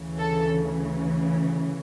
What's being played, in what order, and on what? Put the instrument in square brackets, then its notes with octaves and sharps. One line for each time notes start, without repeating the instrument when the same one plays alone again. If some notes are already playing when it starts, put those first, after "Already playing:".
Already playing: [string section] D2 C#3 E3
A4